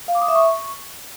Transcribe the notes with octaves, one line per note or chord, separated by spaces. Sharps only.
F5
D6
D#6
E5
C#6